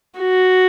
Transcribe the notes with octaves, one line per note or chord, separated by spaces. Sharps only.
F#4